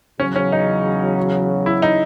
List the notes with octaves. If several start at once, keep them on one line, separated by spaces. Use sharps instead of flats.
E2 C#3 F#3 C#4
C#4
D#4
E4
D#4